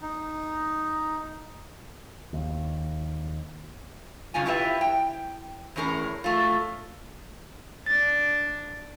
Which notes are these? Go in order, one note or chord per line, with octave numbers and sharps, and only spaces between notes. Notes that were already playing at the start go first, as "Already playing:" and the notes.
D#4
D#2
G2 C#3 C#4 F4 G#5
E4 F4 G4 B4 C5 E5
G5
E2 A2 C#4 G#4 A#4
F#3 A3 F4
D4 A6